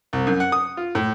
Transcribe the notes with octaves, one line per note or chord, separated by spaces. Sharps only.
C2
F#2
F#5
D#6
F4
A2